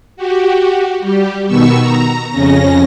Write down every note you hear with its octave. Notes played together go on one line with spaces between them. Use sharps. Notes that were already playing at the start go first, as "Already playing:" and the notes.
F#4 G4
G3 G4
B2 D#3 B3 C#6 E6
A#5
F2 C#3 C#4 A#6